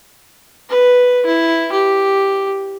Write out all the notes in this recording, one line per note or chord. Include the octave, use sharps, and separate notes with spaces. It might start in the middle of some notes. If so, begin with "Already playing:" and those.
B4
E4
G4